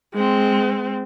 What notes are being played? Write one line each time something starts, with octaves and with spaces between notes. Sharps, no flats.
G#3 C4